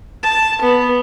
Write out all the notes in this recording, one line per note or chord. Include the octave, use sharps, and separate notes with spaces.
A5
B3